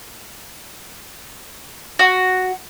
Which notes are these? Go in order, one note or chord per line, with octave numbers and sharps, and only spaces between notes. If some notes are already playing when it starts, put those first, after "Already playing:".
F#4